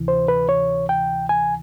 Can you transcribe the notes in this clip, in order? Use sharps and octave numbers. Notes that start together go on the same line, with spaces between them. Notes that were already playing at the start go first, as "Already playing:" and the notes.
Already playing: D2 C3 E3
C5
B4
C#5
G5
G#5